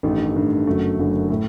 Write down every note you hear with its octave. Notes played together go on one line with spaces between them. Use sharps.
A1 G2 D#3 A3
A1 G2 D#3 A3
F#1 F#2 D3 F#3 A3
F#1 F#2 D3 F#3 A3
A2 A3